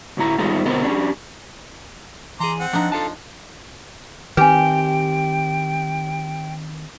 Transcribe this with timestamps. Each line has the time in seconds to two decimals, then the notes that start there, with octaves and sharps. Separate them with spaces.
0.17 D2 A2 E4 A#5
0.39 G#2 D#3 G3 A3 D#4 F4
0.65 D2 B2 B3 C4 A#4 D#5
0.82 C#4 D4 G4
2.40 E3 G#4 A#5 C6 D6
2.60 C4 F#5
2.73 F3 D4 D#4
2.92 F3 A4 F5 A5
4.37 D#3 C4 G4 B4 G5 G#5